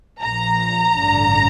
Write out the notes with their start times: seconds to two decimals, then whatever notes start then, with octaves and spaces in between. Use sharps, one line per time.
0.22 A#1 A#2 F3 A#5
0.99 A1 G2 D3